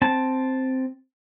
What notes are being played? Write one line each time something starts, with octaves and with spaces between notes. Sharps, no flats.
C4 A5